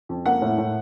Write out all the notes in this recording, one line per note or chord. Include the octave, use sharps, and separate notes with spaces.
F2
A#3 F#5
A2
A2